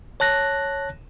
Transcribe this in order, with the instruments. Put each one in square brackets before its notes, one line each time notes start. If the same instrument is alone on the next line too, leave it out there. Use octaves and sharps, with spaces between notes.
[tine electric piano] C#5 A5 F#6 A#6